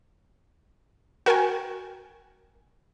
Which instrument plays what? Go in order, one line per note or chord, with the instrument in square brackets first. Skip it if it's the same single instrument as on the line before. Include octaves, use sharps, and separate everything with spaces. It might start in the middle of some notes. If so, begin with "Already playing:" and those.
[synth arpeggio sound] F#4 A#4 G5 G#5